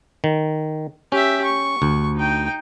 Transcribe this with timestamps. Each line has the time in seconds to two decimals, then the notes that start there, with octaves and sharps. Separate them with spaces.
0.24 D#3
1.12 C#4 G4 E5
1.45 C#6
1.82 D2
2.16 D#4 G5